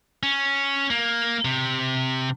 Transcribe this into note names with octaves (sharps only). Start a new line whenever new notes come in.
C#4
A#3
C3